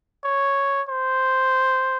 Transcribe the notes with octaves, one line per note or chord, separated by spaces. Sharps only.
C#5
C5